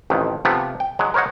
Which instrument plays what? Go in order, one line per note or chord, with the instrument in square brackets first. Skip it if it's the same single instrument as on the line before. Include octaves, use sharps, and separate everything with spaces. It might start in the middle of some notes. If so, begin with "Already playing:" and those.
[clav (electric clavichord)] A1 F2 D#3
C3 F3 A3 B3
G5
F#3 G#3
A#4 C5 C#5 D#5 F#5